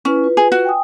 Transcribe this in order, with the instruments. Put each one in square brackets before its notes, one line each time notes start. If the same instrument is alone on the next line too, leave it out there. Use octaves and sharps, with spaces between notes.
[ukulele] C#4 [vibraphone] E4 B4
[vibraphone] F4 B4
[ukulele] G#4
F#4
[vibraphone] G5 G#5 D#6